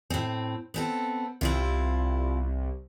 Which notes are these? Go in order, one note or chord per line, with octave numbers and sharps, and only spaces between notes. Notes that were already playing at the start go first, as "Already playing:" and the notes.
A2 C4
B3 C4 A4
C2 C4 E4 F4